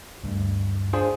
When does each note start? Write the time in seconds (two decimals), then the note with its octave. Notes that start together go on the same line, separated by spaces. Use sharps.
0.24 D2 G2
0.93 D4 F4 G#4 C5